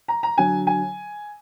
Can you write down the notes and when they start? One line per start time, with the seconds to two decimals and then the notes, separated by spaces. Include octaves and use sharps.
0.08 A#5
0.23 A#5
0.38 D3 F#3 G#5
0.67 G#5